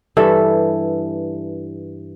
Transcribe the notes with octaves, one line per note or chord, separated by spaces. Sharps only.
G2 E3 A4 E5